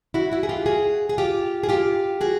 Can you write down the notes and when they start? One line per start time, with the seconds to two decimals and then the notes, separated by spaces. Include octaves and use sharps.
0.14 E4 F#4
0.32 E4 F#4
0.43 G#4
0.49 F4 G4
0.66 F#4 G#4
1.09 G#4
1.18 F4 G4
1.63 G#4
1.69 F4 G4
2.21 F#4 G#4